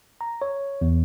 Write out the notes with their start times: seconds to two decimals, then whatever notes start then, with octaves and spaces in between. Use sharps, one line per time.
0.21 A#5
0.42 C#5
0.81 E2